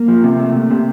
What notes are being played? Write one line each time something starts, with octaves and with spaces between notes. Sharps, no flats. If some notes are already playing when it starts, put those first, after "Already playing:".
Already playing: A#3
F3
C3
A3
C3
C3